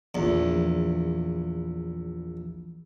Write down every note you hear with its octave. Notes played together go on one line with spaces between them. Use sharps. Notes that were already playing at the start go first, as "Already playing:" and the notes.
A#1 E2